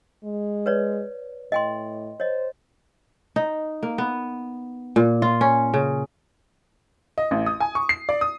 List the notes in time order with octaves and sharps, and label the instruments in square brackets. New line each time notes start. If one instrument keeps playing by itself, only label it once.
[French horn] G#3
[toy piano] B4 C#5 D5
[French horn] A2 [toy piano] D#5 G5 C6
[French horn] C5 [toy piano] C#5 D#5
[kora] D#4
A#3
B3
A#2
F4
C#4
C#3
[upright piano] D#5
A1
D#6
G#5
C#6
C7
D5
D#6